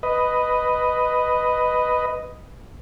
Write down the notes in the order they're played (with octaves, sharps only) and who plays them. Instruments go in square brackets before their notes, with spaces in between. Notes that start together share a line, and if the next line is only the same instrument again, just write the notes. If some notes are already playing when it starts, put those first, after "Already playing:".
[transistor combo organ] B4 D#5